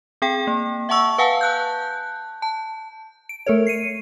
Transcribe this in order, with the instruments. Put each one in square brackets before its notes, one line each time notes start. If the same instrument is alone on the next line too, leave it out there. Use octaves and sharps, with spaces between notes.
[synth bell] C4 G#4 G5
A#3
E5 F#5 A5 C#6 E6
B4 F5 F#5 G#5 A5
A5 F#6 G6
A5
D7
A3 A4 A#4 C#5
C7 C#7 D#7